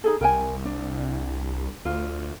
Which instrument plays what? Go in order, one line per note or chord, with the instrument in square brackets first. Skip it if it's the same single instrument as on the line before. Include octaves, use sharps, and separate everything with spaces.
[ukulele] D#4 G#4 A4
[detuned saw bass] C2 [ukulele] A#4 G5 G#5
[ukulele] D4
[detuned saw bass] D2 [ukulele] F4